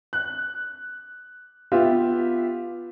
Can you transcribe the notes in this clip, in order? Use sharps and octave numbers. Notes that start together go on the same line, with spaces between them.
F#6
B3 F4 G4 E5